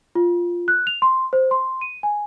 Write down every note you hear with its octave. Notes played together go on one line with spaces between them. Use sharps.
F4
F#6
F7
C6
C5
C6
D#7
G#5